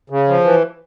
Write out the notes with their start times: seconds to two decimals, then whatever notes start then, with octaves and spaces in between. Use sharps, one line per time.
0.10 C#3
0.28 F3
0.44 E3